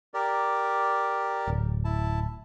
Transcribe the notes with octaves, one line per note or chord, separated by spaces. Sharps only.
G4 A#4 D5
D1
E4 A5